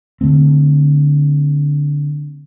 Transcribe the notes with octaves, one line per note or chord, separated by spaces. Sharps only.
D3 F#3 A3 C4